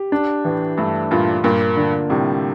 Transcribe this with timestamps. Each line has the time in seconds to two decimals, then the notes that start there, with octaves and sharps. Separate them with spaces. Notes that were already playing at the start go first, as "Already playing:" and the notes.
Already playing: G4
0.12 D4
0.45 A2 E3
0.77 G2 A3
1.11 G2 A#2 F4
1.44 G2 A#2 A#3
1.77 D3
2.10 A2 C3 G3